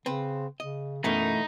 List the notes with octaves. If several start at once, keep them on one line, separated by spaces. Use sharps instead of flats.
C#3 C4 B4
C#3 D#5
F#2 B2 E3 A3 A#3 D#4